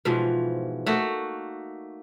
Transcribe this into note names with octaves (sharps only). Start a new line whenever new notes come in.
G#2 B2 E3 F3
A3 A#3 D#4 F#4